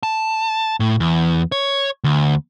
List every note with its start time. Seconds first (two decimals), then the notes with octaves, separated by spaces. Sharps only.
0.03 A5
0.80 A2
1.00 E2
1.52 C#5
2.04 D2